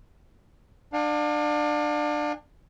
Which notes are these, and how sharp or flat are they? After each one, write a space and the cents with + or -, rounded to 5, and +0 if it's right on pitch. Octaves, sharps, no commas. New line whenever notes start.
D4 +25 F5 +35 G#5 -35